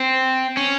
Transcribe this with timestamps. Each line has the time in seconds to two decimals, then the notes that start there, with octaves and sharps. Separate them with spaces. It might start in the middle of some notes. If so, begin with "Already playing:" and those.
Already playing: C4
0.57 C#4